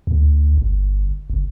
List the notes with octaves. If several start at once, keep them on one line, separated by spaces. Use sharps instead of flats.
D2
G1
F#1